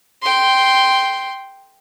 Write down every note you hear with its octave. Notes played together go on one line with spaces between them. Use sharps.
G5 C6